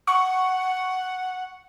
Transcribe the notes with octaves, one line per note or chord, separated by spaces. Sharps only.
F#5 C#6